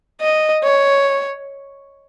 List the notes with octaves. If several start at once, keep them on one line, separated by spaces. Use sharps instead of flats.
D#5
C#5